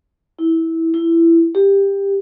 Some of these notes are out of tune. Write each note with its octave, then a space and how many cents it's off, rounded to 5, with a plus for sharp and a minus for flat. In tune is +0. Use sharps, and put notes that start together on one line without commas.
E4 -15
E4 +15
G4 +15